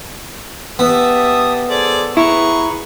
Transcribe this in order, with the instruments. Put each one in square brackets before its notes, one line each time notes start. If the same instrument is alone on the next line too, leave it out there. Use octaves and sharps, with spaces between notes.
[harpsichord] B3 [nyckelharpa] G4 E5 [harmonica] A5 D#6
[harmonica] G#4 C5 D5 [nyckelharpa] A4
[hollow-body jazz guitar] E4 [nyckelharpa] G#4 B4 [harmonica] A#5 C#6